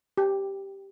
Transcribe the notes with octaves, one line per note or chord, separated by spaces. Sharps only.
G4